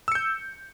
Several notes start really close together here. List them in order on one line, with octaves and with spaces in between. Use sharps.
E6 C#7 G6